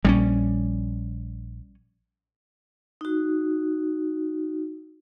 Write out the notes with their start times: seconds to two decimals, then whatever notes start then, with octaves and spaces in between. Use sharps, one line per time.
0.05 A#1 G3 C4 C#4
3.01 D#4 F#4